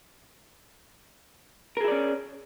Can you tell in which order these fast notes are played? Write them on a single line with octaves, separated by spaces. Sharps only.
A#4 G#4 E4 D5 C#4